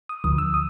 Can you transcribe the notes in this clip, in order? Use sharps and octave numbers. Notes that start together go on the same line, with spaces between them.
D#6
D2 D3 F3 D#6
E6
D#6